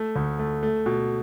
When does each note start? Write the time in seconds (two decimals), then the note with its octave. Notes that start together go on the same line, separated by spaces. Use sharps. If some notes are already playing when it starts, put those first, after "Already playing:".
Already playing: A3
0.16 D2
0.39 A3
0.63 A3
0.86 B2